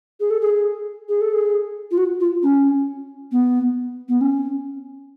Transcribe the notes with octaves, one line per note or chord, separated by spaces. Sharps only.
G#4
A4
G#4
G#4
A4
G#4
F4
F#4
F4
C#4
B3
B3
C#4